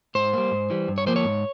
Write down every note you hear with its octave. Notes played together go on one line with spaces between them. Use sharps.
G#2 C5
G3 A#3
G#2
E3 G3
G2
C#5
F3 A#3 C5
C#5
G#2